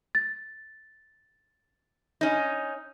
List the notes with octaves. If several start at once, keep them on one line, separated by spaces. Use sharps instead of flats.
A6
C#4 D#4